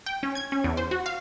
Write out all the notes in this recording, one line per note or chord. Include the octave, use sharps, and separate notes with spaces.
G5
C#4
G#6
C#4
E2
C5
F#4
F5